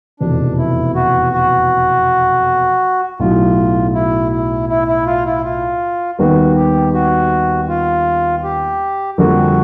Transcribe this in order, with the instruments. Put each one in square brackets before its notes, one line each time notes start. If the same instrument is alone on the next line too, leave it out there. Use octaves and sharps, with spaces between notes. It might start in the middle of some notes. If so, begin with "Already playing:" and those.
[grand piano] F1 E2 B2 [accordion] D4
[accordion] E4
F#4
F#4
[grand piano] B1 A2 F#3 [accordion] F4
[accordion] E4
E4
E4
E4
F4
E4
F4
[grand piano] D#2 D#3 G3 B3 [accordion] F#4
[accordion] G4
F#4
F4
G4
[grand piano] F2 D3 G3 A#3 [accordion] F#4